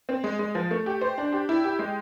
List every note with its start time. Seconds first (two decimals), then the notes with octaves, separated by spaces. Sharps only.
0.09 C4
0.24 G#3
0.39 G#3
0.55 F3
0.71 A3
0.86 G4
1.01 C5
1.18 D4
1.33 G4
1.49 E4
1.64 G4
1.79 G#3